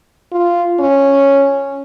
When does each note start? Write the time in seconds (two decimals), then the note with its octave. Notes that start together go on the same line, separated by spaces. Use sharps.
0.32 F4
0.79 C#4